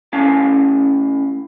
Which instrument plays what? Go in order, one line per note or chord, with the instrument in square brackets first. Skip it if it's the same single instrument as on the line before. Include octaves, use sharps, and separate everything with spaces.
[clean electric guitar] A2 C#4 F5 A5